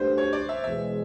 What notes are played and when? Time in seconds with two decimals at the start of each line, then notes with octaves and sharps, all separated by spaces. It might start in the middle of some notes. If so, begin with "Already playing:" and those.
Already playing: D2 D3 G3 B4 C5
0.18 C#5
0.33 D5
0.49 E5
0.64 E2 B2 G#3 E5